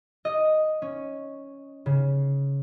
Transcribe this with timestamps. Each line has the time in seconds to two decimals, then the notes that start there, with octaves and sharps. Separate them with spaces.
0.25 D#5
0.82 C#4
1.86 C#3